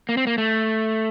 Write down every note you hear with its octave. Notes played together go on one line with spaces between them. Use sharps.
A#3
C4
A#3
A3